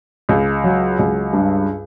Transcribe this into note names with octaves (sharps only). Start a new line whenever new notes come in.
C#2
F#3
C#2
G2